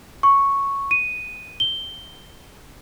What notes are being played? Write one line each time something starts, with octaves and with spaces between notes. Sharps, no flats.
C#6
D#7
G7